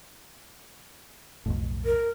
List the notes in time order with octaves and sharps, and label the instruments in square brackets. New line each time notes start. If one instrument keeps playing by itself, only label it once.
[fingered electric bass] B1 F2 A2
[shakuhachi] A#4